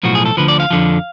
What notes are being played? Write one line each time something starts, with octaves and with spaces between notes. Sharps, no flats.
B1 A2 F3 F#4
G#4
A4
D2 D3 F3 B4
D5
F5
F2 D3 F3